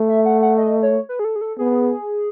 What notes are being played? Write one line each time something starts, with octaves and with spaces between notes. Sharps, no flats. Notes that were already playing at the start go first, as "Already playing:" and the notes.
Already playing: A3
E5
F#5
F#5
D#5
C#5
B4
G#4
A4
G#4
A4
B3 G#4